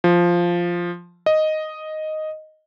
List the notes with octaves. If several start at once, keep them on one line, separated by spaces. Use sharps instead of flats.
F3
D#5